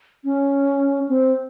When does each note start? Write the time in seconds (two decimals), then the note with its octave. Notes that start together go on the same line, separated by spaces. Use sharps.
0.24 C#4
1.08 C4